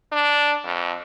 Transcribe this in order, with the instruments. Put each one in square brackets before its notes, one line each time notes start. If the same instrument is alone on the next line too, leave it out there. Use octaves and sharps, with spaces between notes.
[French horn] D4
F2